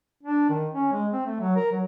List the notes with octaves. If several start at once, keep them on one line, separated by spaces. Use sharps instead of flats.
D4
D#3
C#4
G#3
C4
A3
F#3
A#4
F#3